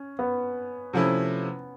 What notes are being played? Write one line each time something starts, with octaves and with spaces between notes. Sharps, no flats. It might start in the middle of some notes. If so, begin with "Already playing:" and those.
Already playing: C#4
B3
C3 F3 A3 C#4 E4